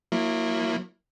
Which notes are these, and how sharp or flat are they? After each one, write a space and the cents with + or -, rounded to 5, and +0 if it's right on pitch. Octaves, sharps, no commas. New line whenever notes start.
F#3 -25 A#3 +0 E4 +0